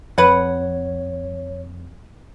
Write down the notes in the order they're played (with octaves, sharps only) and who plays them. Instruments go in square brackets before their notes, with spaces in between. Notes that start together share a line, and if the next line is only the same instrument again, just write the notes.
[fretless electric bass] F2 [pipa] B4 F#5 [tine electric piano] C#5